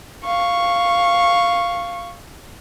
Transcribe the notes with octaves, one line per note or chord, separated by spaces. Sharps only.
F5 C#6